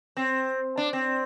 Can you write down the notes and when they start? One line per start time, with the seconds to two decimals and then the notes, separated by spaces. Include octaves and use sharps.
0.17 C4
0.78 D4
0.93 C4